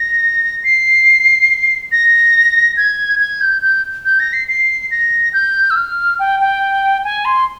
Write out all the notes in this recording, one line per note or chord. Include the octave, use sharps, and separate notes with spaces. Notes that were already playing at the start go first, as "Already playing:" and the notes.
Already playing: A#6
C7
A#6
G#6
G#6
G6
G6
G6
A#6
C7
C7
A#6
G6
E6
F6
G5
G5
G#5
C6